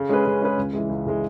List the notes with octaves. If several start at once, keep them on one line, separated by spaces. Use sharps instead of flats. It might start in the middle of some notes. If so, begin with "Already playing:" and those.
Already playing: C#3
G#3 C#4 G#4 B4
C#3
G#3 C#4 G#4 B4
C#2
C#3 E3 G#3
C#2
C#3 E3 G#3